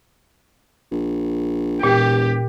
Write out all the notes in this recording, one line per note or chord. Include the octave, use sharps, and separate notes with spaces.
A#1
E1 A#2 G4